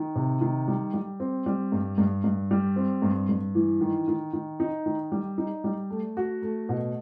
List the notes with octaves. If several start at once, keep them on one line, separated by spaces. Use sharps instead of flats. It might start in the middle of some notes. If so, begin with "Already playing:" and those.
Already playing: D#3
C3
D#3
G3
G3
C4
G3
G2
G2
G2
G3
C4
G2
G2
E3
D#3
D#3
D#3
D#4
D#3
G3
D#4
G3
A3
F#4
A3
B2